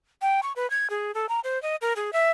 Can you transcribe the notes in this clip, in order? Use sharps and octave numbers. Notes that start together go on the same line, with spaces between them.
G5
C#6
B4
G#6
G#4
A4
A#5
C5
D#5
A#4
G#4
E5